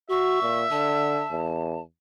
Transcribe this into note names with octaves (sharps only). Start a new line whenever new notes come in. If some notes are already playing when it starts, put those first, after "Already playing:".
F#4 E5 C#6
A#2
D3 A5
E2